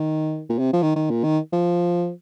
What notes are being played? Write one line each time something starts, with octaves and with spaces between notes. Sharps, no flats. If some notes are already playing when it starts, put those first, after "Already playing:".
Already playing: D#3
A#2
C3
F3
D#3
D#3
A#2
D#3
F3